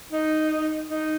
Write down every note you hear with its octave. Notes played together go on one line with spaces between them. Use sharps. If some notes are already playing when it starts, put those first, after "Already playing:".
D#4
D#4